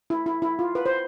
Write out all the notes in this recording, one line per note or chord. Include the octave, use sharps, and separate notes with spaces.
E4
E4
E4
F4
B4
C5